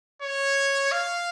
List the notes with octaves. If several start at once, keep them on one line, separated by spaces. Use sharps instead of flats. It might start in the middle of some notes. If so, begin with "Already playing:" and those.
C#5
F5